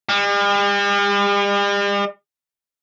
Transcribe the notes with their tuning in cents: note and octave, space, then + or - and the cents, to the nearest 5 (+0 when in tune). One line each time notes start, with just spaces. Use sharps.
G3 +45